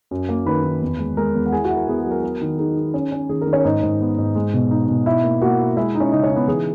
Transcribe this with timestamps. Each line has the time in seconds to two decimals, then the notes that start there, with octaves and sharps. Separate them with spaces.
0.11 F#2
0.29 A#3
0.46 D#3 B4 B5
0.64 D#3
0.82 E2
0.99 G#3
1.17 G#3 A#4 A#5
1.35 E2
1.46 F#5
1.52 E4 G#4 G#5
1.64 F#4 F#5
1.70 E4
1.76 A#4
1.88 B3 G#4
2.00 G#4
2.06 F#3
2.11 A#4
2.23 F#3 A#4
2.41 D#3
2.58 D#4 G#4
2.76 D#4
2.94 C#4
3.12 C#4
3.29 D#3 G#4
3.41 A#4
3.47 D#3
3.53 C#4 C#5
3.65 G#2 D#4 D#5
3.82 G#2
4.00 B3
4.18 G#2
4.35 G#3
4.53 B2
4.71 D#4
4.88 B2
5.06 E4 E5
5.24 A#3
5.42 A#3 F#4 F#5
5.59 E4
5.77 G#3 E4 E5
5.95 D#4
6.00 C#4 C#5
6.12 C#3 D#4 D#5
6.24 C#4 C#5
6.30 D#4
6.36 B3 B4
6.48 E3 G#4